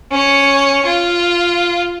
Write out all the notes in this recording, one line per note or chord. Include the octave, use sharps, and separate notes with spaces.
C#4 C#5
F4